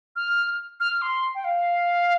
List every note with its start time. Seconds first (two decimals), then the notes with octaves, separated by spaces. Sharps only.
0.16 F6
0.80 F6
1.02 C6
1.35 G5
1.44 F5